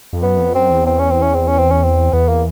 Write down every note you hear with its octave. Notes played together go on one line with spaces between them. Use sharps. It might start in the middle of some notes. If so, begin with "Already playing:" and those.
F2
F#2 B3
F2
F#2 C4
E2
C4
C#4
C4
C#4
C4
C#4
C4
C#4
C4
E2 B3
A#3